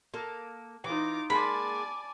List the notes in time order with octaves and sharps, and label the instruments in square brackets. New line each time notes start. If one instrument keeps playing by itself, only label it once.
[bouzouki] A#3 A4
[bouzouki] E3 [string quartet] D#4 F4 D6
[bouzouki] G#3 A#3 [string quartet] D5 G#5 A5 [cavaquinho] B5